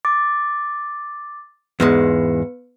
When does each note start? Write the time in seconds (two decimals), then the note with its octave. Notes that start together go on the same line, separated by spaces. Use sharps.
0.05 D6 A6
1.80 E2 G#2 G#3 B3 B4 C#7